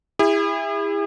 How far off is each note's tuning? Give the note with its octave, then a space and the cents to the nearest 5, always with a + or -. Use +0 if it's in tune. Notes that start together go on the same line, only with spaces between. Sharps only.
E4 +0 G#4 -45